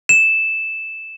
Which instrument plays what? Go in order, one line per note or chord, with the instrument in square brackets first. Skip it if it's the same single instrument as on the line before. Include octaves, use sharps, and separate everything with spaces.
[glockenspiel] E7